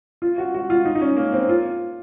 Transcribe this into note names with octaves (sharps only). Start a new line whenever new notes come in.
F4
F#4
F#4
F4
D#4
D#4
C#4
A#3
C4
F4